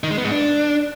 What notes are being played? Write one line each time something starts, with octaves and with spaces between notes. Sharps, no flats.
D#3
G#3
B3
G#2
D4